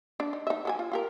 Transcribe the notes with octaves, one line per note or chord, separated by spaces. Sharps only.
D4
D#4
D#4 E5
F#3 A4 G#5
F4
F4 G4 A#4